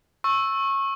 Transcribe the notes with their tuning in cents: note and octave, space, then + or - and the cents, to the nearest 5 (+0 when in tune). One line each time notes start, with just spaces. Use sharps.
C#6 -20 E6 +0